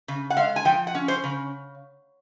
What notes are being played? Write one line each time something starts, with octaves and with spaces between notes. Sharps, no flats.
C#3
F#5
G#3 F5
G#5
F3 G5
F#5
C#4
C5
C#3